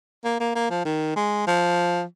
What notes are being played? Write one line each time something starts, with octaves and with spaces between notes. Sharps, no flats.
A#3
A#3
A#3
F3
D#3
G#3
F3